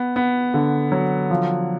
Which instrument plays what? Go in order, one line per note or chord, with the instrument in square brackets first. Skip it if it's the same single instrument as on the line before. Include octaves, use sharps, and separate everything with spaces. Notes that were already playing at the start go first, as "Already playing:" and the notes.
Already playing: [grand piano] B3
B3
D3
F#3
F3